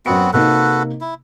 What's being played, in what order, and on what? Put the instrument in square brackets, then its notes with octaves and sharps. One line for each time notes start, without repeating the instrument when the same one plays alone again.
[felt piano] F#2 C#7 [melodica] B3 C4 F#4
[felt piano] C3 A#3 D#4 [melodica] F#4 A4 B4
[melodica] E4